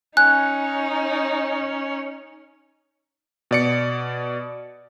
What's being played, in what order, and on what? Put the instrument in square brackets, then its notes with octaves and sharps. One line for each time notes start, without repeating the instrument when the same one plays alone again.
[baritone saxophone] C#4 [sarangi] D#4 [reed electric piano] G#5 [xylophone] F#6
[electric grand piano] B2 D5 C#7